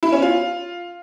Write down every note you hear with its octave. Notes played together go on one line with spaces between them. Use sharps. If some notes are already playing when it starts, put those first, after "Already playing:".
E4
C#4
F4